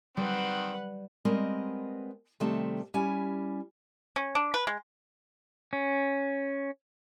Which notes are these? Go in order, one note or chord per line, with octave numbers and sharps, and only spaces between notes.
D#3 G3 C4 B4 F#5
G3 G#3 B3 C4 A#4 D#5
C3 D#3 G3 A3 C4 A5
G3 C#4 E4 G#5
C#4
D4
B4
G#3
C#4